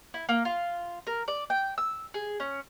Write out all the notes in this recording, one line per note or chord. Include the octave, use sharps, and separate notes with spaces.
E4
A#3
F4
A#4
D5
G5
E6
G#4
C#4